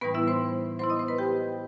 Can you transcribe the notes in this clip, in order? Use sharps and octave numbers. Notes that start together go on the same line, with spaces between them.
A2 E3 G3 B3 D#4 B4
E4 E5
C5 C6
F#3 B3 E4 C5 C6
D#5 D#6
C5 C6
B4 B5
G4 G5